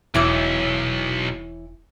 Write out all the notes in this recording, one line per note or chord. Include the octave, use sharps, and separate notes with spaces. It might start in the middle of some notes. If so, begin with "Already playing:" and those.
E1 B1 E3 E4 C#5